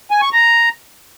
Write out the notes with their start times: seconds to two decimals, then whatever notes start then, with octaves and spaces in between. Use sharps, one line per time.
0.11 G#5
0.22 C#6
0.32 A#5